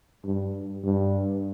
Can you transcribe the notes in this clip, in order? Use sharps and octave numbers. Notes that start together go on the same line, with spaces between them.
G2
G2